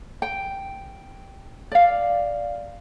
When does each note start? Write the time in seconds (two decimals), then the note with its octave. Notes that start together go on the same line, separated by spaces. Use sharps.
0.22 G5
1.72 D5 F5